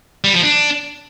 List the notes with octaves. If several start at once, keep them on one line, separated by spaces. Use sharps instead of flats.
G3
F3
D4